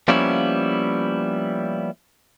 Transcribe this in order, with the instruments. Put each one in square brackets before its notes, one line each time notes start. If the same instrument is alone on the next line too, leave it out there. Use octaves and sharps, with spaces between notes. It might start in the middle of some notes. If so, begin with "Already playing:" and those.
[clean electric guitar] F3 G3 A#3 B3 C#4 E4